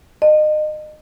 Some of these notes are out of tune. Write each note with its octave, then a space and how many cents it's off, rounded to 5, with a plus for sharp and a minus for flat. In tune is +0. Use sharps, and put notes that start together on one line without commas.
D#5 -30